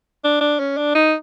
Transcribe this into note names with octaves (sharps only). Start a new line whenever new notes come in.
D4
D4
C#4
D4
D#4